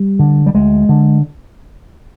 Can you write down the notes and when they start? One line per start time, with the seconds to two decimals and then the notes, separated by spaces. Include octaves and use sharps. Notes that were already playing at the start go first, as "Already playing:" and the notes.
Already playing: G3
0.19 D3
0.46 G3
0.55 D2 G#3
0.89 D3